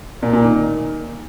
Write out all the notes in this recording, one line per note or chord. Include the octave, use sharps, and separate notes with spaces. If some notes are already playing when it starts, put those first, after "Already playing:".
A#2
A#2
D#3